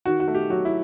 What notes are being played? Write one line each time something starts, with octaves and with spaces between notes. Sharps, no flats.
D#3 F#4
F#4
A3
G4
F#3 F#4
E4